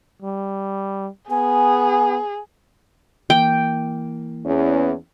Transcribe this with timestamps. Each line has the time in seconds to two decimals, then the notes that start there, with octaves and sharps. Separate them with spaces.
0.22 G3
1.30 B3 G#4 G#5
3.30 E3 A#3 G5
4.45 E2 C#4